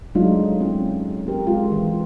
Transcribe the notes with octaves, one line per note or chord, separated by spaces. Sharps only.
F#3 G#3 A3 D4 D#4 F4
C4 C#4
C4 G4 A#4
G#3 F4
E3